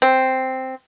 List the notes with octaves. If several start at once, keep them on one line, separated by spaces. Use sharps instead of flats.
C4